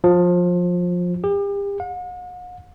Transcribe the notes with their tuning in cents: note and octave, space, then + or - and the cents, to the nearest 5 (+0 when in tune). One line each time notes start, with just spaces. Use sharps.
F3 +25
G4 +40
F#5 -45